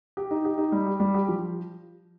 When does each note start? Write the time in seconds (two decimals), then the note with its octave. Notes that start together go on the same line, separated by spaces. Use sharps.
0.17 G4
0.31 D#4
0.45 G4
0.58 D#4
0.72 G3
0.87 G4
1.00 G3
1.14 G4
1.28 F3